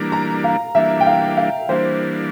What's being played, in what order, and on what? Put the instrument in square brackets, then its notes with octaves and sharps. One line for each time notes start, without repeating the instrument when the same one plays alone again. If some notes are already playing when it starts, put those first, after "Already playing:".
Already playing: [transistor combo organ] E3 G3 A#3 D4 [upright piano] A#5
[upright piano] A#5
F5
[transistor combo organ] E3 G3 A#3 D4 [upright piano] E5
[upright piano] G5
F5
F5
[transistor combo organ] E3 G3 A#3 D4 [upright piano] C5